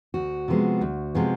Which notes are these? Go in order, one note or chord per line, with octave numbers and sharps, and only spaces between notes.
D2 F#4
C3 F3 G#3 B3
D2
C3 F3 G#3 B3